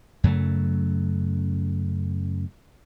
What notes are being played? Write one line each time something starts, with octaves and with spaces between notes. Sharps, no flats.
F#2 C#3 F#3 A3